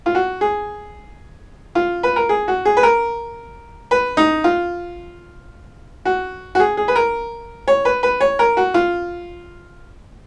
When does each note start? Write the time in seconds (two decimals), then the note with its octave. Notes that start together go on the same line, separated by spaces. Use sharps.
0.06 F4
0.15 F#4
0.41 G#4
1.75 F4
2.03 B4
2.16 A#4
2.29 G#4
2.48 F#4
2.65 G#4
2.77 B4
2.83 A#4
3.91 B4
4.17 D#4
4.44 F4
6.05 F#4
6.55 F#4
6.60 G#4
6.77 G#4
6.88 B4
6.96 A#4
7.68 C#5
7.85 B4
8.03 B4
8.21 C#5
8.39 A#4
8.57 F#4
8.74 F4